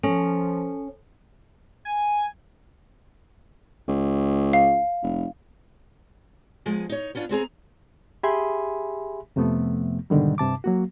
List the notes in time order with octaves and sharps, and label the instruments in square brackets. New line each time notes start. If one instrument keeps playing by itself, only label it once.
[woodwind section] F3 [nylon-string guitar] C#4 [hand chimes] A4
[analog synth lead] G#5
[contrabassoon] C#2
[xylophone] F5
[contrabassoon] F1
[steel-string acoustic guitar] F3 G#3 B3 G#4
D#4 C#5
B3 C#4 D4 F4
B3 C4 G#4 A#5
[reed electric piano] G4 G#4 E5 G#5 B5 C6
F2 C3 F3 A3 B3
G#2 B2 D3 D#3 G3
G2 C3 A5 D6
F#3 A#3 F#4